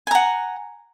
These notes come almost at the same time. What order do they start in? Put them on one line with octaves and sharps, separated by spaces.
G#5 A#5 F#5